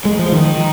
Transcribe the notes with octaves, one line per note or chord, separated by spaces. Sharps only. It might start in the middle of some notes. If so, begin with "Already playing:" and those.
G#3
F3
D#3